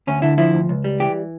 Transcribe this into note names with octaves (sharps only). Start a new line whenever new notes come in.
D2 C#4
D3 E4
F3 E4
D2
C#2
G3
E3 G4